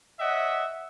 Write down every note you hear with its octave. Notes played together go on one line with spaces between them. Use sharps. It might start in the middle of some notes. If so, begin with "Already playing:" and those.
C#5 D#5 E5 F#5